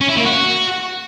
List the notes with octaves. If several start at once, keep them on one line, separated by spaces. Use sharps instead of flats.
C#4
E4
A#3
F#4